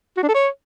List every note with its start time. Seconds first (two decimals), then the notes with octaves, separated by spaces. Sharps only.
0.17 F#4
0.23 D4
0.29 A4
0.34 C#5